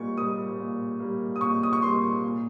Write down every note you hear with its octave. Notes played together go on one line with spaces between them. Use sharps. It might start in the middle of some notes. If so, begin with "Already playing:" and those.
Already playing: A#2 G3 A#3 C#6
G3 A#3 D#6
A#2
G3 A#3
D#6
A#2 C#6
D#6
C#6
G3 A#3 C6
A#2